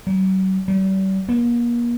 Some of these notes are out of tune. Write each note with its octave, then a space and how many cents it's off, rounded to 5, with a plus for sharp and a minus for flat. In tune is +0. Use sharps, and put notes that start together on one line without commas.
F#3 +40
G3 -40
A#3 +35